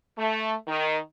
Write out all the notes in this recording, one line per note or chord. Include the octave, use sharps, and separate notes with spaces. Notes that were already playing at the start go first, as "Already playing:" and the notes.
A3
D#3